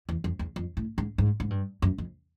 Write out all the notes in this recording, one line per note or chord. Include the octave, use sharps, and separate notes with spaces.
E2
F2
E2
F2
A2
G#2
G#2
G#2
G2
F#2
F2